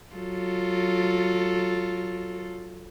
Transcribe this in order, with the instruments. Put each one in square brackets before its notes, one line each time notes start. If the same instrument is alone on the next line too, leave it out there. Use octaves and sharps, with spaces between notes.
[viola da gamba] F#3 F4 A4